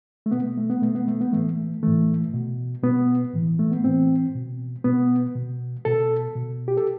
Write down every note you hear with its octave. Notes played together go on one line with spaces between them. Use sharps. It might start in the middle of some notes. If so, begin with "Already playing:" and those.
A3
B2 B3
A3
B3
B2 A3
B3
A3
B3
A2 E3 A3
A2 E3 A3
B2
B2 B3
A2 E3
A3
B3
A2 E3 C4
B2
B2 B3
B2
B2 A4
B2
G4
A4